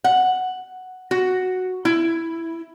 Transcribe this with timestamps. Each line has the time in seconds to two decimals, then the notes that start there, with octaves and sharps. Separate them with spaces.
0.04 F#5
1.11 F#4
1.85 E4